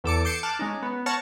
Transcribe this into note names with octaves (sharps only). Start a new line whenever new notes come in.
E2 A4 D6 C#7
D6 G6 C7 C#7 E7
A5 D6 F6 F#6
G#3 C#4 D#4
B3
C#5 F#5 A5 C#6 F6 A#6